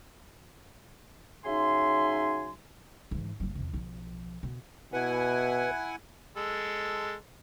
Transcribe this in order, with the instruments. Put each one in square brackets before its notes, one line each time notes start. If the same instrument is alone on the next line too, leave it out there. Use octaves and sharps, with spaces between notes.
[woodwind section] C#3 F#3 D#4 E5 G#5 C6
[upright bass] G#2 E3
F#1 F#3
E2 C3
B1 F3
B2
[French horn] B2 [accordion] E4 F#5 G#5 [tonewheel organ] B4
[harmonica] G#3 A4